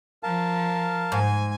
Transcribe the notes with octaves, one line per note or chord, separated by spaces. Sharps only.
F3 A#4 F5 A5
G#2 G#5